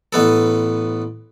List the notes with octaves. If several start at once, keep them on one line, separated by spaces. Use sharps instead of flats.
A1 B3 A4